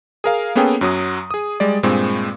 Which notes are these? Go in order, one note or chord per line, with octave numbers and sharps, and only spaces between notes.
G#4 A#4 F5
A#3 B3 C#4 G#4 A4 G5
F#2 F#3 D#6
G#4 D#6
G3 G#3 D5
G2 A#2 G#3 C4